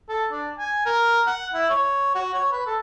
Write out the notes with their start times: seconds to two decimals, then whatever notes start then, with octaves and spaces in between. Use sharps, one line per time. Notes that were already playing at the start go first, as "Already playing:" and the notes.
0.09 A4
0.32 D4
0.58 G#5
0.86 A#4
1.27 F#5
1.53 E4
1.70 C#5
2.15 F#4
2.34 C#5
2.52 B4
2.67 A4